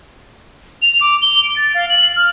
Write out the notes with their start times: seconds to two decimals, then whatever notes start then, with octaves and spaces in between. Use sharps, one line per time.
0.82 F7
1.01 D6
1.22 G7
1.44 D7
1.56 A6
1.75 F5
1.90 F#7
2.16 F6